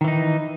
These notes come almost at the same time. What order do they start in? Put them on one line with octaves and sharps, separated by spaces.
D#3 E3 D#4